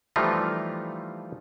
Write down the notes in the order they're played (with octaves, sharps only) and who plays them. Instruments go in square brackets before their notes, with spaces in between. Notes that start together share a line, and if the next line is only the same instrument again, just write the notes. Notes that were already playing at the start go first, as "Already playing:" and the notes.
[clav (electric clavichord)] E3 F3 G3 A3 D#4 F4